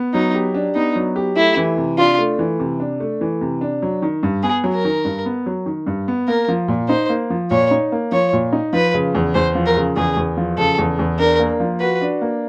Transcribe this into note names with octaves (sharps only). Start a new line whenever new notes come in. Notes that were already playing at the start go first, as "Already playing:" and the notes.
Already playing: B3
F#3 D#4
G4
D4
B3 D#4
F#3
G4
A3 E4
E3
C3
D4 F4
A3
E3
C3
D4
A3
E3
C3
D4
F#3
D#3
G2
B3 G#4
F#3
A#4
D#3
G2
B3
F#3
D#3
G2
B3
A#3 A#4
F3
A#2
D#4 C5
A#3
F3
A#2 C#5
D#4
A#3
F3 C#5
A#2
D#4
F3 B4
C#3
E2
E2 C5
F3
A#4
C#3
E2 G#4
E2
F3
C#3 A4
E2
E2
D4 A#4
A#3
F3
F#4 B4
D4
A#3